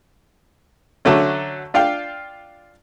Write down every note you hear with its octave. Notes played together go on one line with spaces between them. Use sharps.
D3 F#3 A3 C#4
D4 F4 F5 G5